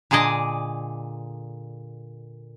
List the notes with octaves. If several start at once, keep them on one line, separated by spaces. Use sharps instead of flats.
A#2 D3 G#4 D5 D#5